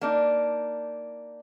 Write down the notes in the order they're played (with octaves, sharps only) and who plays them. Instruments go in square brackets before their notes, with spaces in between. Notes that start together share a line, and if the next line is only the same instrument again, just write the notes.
[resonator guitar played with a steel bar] A#3 D4 D#4